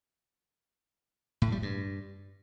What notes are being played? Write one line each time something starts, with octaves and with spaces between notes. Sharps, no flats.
A2
G3
G2